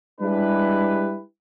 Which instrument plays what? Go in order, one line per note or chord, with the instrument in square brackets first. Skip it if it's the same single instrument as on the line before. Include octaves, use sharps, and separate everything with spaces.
[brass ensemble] G3 G#3 D4 E4 G4 B4